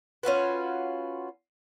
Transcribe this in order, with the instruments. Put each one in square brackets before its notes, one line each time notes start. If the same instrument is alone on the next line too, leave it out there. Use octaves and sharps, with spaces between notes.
[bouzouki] C#4 F4 F#4 B4